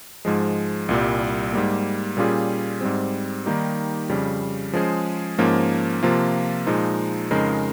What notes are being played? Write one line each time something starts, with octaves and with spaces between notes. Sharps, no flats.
G#2 F3 G#3
C2 A#2 G3
G#2 G3 A#3
A#2 G3 C#4 F4 G#4
G#2 G3 C4
D#3 G3 A#3 D#4 G4
F2 C#3 G3
F3 G#3 C#4 G#4 C5
G#2 F3 A#3 C#4
C3 F3 A#3 F4
A#2 F3 G#3 D#4
F2 C#3 G#3 D#4 A#4